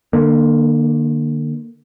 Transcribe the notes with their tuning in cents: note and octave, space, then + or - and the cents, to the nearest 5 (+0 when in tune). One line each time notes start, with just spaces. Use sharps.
D3 +35 A#3 +10